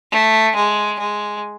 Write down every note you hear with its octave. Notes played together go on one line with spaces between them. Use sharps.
A3
G#3
G#3